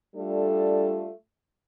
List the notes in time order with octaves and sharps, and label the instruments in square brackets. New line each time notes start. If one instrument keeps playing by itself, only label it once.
[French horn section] G3 A3 D4 F4 A4